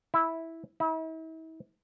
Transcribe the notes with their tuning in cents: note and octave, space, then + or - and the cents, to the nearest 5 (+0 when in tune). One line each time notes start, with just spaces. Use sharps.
E4 -10
E4 -45